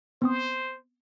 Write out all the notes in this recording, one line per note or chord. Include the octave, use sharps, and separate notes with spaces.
B3 C4 C5 D#6